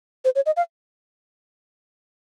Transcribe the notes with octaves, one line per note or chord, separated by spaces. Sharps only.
C5
C#5
D#5
F5